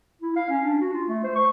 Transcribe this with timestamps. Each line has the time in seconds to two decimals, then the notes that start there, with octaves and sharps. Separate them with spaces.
0.22 E4
0.36 F5
0.50 C#4
0.64 D4
0.81 F#4
0.93 F4
1.08 A3
1.24 C5
1.35 C#6